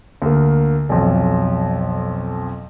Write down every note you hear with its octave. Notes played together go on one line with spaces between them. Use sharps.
D2 A#3
B1 F2